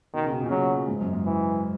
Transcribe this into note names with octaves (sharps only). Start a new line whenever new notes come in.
B2 D#3
C#3
B2
A#2
C#3
B2 F#3
G#2
F#2
G#2
E3